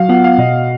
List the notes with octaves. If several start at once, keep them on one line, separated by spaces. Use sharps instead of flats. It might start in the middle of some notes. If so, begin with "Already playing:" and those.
Already playing: F#3 F#4 F5
B3 F4 F#5
F5
B2 D#5